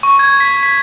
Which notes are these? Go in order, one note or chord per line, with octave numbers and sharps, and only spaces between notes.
C#6
G#6
B6
B6